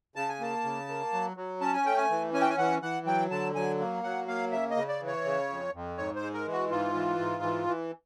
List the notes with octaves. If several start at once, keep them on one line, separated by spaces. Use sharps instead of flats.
C#3 A5
G#5
A#3 A5
C#3
A#3
F#3
F#3
C#4 A5
G#5
A3 G5
G#5
E3
C#4 G#5
G5
G#5
E3 F#5
E3 F#5
F#3 G5
D3 A5
F#3 G#5
A#3
F#3 F#5
A#3 F5
C#3 E5
D#5
C#3
D5
E3
C#5
C#3
F2
F2
G#2 C#5
C5
G#3
A#4
E3
F#4
G#2 F4
E3
G#2
E3
E3